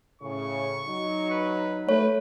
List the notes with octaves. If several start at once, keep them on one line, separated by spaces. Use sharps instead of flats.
A2 C#3 C#6
F#3 D#4
B4
A3 B4 C#5